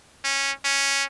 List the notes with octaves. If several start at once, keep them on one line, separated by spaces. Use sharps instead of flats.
C#4
C#4